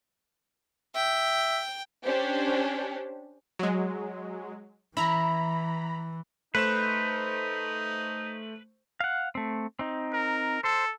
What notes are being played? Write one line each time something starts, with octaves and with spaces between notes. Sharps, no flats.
E5 G5
C#4 D4 G4 C5
F#3 G#3
E3 E4 A#5 B5
A3 D#4 B4 C5 E7
F5 F#5
A3 C4
C4 D#4
A#4
A4 C5